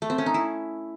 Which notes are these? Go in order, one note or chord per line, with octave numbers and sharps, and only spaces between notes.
A3
C4
C#4
D#4
E4